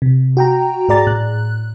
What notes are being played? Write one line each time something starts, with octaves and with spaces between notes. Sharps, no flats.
C3
F#4 G5 A#5
G#2 G#4 D5 A#5 A6
A2 F#6